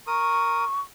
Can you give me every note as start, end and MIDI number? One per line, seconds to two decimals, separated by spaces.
0.07 0.65 70
0.07 0.80 85
0.07 0.65 87